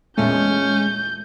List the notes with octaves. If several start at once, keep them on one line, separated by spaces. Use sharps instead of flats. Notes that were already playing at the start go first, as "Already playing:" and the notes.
E2 A#2 G#3 A3 C#4 G6